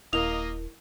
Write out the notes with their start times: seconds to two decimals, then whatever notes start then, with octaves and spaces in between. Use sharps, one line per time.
0.13 D#1 A#3 E4 A#4 D#5 F7